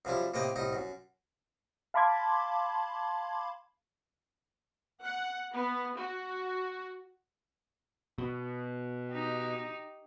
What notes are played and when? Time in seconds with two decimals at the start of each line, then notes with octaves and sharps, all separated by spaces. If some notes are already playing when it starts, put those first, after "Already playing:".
0.05 F#2 F3 G3 E4
0.34 A2 C3 A#3 D#5 G5
0.56 C2 A2 D#4
0.73 F#2
1.94 F5 A5 B5 C6 D6 G#6
5.02 F#5
5.52 B3
5.96 F#4
8.18 B2
9.11 D#4 G4